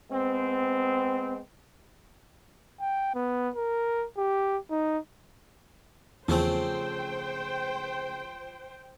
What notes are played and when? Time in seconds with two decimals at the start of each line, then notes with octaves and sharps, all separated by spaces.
0.11 G#3 B3 C4
2.81 G5
3.15 B3
3.56 A#4
4.17 G4
4.71 D#4
6.28 E2 C#3 F3 A3 C4 C5 G5